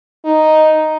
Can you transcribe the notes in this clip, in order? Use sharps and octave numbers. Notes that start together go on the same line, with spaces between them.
D#4